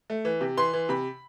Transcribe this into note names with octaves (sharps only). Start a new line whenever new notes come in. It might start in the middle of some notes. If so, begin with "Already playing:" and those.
A3
E3
C3
E3 C6
E3
C3 B5